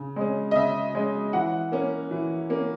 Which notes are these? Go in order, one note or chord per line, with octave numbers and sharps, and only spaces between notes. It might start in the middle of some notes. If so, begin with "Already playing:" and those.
Already playing: C#3
G#3 C#4
D#5
C#3 E5
G#3 C#4
E3 F#5
A#3 C#4
E3
A#3 C#4